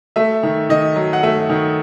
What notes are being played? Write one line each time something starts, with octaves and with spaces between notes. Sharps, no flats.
A3 E5
D#3
D#3 D#5
F#3
F#5
A3 E5
D#3